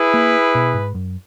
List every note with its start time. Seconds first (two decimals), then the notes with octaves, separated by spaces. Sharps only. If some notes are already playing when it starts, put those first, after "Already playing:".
Already playing: E4 G#4 B4
0.14 A#3
0.55 B2
0.74 G#2
0.95 F#2